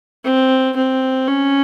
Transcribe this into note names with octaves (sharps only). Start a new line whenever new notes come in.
C4
C4
C#4